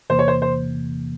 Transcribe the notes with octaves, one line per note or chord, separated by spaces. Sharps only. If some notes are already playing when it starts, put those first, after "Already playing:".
E2 C3 E3 A#3 C5
C#5
C5
C5